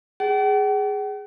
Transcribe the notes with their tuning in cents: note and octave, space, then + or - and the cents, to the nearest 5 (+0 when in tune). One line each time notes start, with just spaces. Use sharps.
G#4 +0 F#5 +45